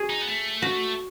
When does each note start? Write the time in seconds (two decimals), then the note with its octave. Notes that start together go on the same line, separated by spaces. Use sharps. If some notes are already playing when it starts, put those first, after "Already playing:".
Already playing: F#4 G#4
0.10 D#4
0.22 B3
0.27 A3
0.62 F#4